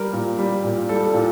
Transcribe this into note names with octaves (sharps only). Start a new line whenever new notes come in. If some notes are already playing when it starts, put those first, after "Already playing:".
Already playing: G3 A#4
A#2
G3
A#2
G3 A4
A4
A#2